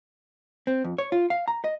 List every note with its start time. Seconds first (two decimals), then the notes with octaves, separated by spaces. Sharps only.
0.67 C4
0.84 F2
0.98 C#5
1.12 F4
1.30 F5
1.48 A#5
1.64 D#5